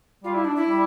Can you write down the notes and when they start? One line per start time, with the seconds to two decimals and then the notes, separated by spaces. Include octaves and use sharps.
0.23 G3 F4
0.34 E4
0.45 D4
0.56 E4
0.68 G3